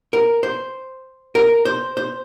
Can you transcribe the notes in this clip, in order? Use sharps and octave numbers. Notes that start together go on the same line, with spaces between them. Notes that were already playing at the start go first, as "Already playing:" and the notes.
A#4
C5
A#4
C5
C5